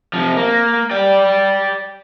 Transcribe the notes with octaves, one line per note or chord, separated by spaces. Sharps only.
C3 F3
A#3
D5 G5